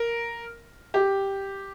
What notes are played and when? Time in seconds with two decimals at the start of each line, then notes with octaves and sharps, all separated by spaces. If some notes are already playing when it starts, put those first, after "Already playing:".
Already playing: A#4
0.94 G4